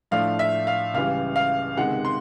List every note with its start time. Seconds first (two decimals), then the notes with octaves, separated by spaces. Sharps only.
0.11 A2 F3 A3 D4 F5
0.39 E5
0.67 F5
0.94 C#2 C#3 E3 G3 F5
1.36 F5
1.77 C#2 C3 D#3 G#3 F#5
2.05 C6